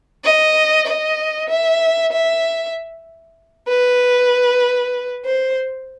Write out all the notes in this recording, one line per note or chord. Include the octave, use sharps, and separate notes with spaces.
D#5
D#5
E5
E5
B4
C5